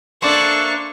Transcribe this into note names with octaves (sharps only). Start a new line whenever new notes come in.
A#3 D4 A4 C5 D5 E5 C#6